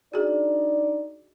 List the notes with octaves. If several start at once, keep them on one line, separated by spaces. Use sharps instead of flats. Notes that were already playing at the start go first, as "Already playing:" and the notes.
D4 D#4 F#4 G#4 D5